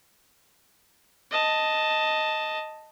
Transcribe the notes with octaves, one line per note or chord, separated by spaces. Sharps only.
D#5 A5